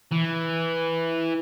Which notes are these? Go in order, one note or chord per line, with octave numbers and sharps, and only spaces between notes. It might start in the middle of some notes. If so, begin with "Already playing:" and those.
E3